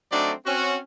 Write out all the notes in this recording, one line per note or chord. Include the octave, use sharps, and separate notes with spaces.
F#3 A3 C4 D4 D#4 D5
C4 C#4 F#4